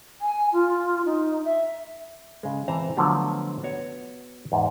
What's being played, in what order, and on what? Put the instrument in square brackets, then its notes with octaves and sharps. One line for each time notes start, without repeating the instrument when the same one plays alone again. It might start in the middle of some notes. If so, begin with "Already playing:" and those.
[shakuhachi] G#5
F4
D#4
E5
[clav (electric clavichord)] C#3 G#3
E3 C4 C5 A5 A#5
D3 F3 F#3 A3 B3
B3 F#4 C#5
E2 G#2